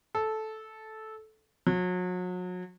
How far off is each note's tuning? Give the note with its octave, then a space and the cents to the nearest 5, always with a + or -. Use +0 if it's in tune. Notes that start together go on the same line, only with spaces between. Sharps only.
A4 -10
F#3 -35